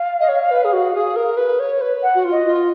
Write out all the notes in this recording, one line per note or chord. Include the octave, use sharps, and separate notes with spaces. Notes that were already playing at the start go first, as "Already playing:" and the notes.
Already playing: F5
D#5
C#5
B4
G#4
F#4
G#4
A#4
B4
C#5
B4
F#5
F#4
F4
D#5
F4